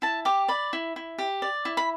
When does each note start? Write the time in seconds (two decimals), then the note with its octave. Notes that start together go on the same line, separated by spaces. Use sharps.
0.02 E4 A5
0.25 G4 D6
0.48 D5 B5
0.73 E4
0.96 E4
1.18 G4
1.42 D5
1.65 E4
1.77 B5